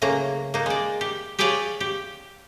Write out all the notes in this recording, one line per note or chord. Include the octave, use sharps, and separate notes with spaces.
A2 C#3 F#3 A#3 A#5
A#3 D#4
G#3 D5
G4
G4 G#4 B4 C#5 D5 F5
G4